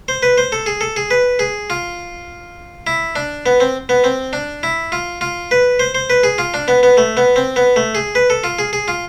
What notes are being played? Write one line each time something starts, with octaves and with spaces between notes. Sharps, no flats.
C5
B4
C5
A4
G#4
A4
G#4
B4
G#4
F4
E4
D4
B3
C4
B3
C4
D4
E4
F4
F4
B4
C5
C5
B4
G#4
F4
D4
B3
B3
A3
B3
C4
B3
A3
G#4
B4
A4
F4
G#4
G#4
F4